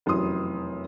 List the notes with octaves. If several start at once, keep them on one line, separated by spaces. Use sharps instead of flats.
F1 F#2 E3 C6 D#6